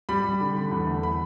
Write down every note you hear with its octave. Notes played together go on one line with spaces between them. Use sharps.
G3 B5
G3
D3
D3
E2
A3
A3 B5